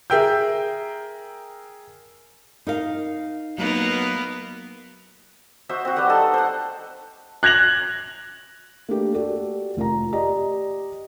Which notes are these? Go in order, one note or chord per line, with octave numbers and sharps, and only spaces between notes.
G#4 A#4 E5 G5 E6 G6
D#4 A#4 F5
F#3 A#3 B3 D#4 A#4
F#4 C5 D#5 E5
C4 F#4
G3 B4 E5 F#5
D#4 A4 D#5 C6
C5 F#5
F#6 G#6 A#6 F7 F#7
A3 A#3 D4 G4
F#4 G4 A4 D5
F1 F4 A#4 A#5
G4 D5 D#5 A#5